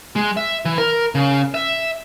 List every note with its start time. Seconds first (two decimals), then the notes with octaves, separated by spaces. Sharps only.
0.16 G#3
0.37 E5
0.65 E3
0.78 A#4
1.15 C#3
1.54 E5